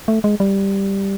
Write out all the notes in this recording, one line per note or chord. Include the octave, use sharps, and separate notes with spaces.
A3
G#3
G3